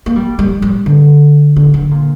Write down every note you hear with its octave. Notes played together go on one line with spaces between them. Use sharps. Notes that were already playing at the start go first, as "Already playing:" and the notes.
A#3
G3
G3
G3
D3
D3
D3
A#2